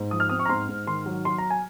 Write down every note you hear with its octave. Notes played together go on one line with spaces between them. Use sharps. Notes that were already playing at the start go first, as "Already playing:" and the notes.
Already playing: G#2
F3 D#6
F6
C4 D#6
C#6
A#5
G#2 C6
G#2
D#3 C6
F#3
F#3 C6
A#5
G#5